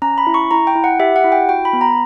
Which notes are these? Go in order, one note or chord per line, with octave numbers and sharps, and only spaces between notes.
C#4 A#5
B5
E4
C#6
E4 A#5
G5
E4
F#5
G4 E5
F#5
E4
G5
F#4 G5
B5
B3
A#5